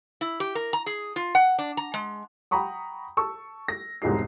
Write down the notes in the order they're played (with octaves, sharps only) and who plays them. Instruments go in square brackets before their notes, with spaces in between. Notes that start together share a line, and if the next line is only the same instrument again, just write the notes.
[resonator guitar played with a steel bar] E4
G4
A#4
A#5
G#4
F4
F#5
D4
A#5
G#3
[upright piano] F#5 G5 A#5 B5 C#6 D#6
A5 C#6 E6
A#6
E1 C2 G#2 D#4 G#4 C7